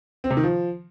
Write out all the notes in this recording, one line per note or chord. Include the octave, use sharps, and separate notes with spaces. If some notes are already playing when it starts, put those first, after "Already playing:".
C4
C3
D#3
F3